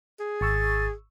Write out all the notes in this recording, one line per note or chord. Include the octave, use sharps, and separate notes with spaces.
G#4
G#1 C#6 E6 A6